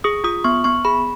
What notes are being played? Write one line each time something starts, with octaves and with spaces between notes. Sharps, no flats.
G#4 D#6
F4 D#6
B3 C#6
B3 C#6
G#4 B5